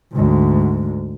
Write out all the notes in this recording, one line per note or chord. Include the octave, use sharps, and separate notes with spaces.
D2 G#2